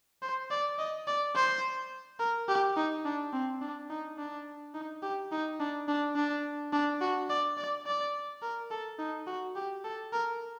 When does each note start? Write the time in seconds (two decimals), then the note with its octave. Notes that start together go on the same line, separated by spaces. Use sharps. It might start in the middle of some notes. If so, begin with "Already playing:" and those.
0.22 C5
0.51 D5
0.78 D#5
1.07 D5
1.35 C5
2.19 A#4
2.48 G4
2.76 D#4
3.05 D4
3.33 C4
3.61 D4
3.90 D#4
4.18 D4
4.74 D#4
5.02 G4
5.32 D#4
5.60 D4
5.88 D4
6.16 D4
6.73 D4
7.01 F#4
7.29 D5
7.57 D5
7.86 D5
8.42 A#4
8.71 A4
8.99 D#4
9.27 F#4
9.56 G4
9.84 A4
10.13 A#4